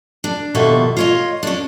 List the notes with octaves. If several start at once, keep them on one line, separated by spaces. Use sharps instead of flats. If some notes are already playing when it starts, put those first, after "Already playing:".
D4
D#2 B2 F3 A4 E5
F4 C#5 D#5
C#4 D4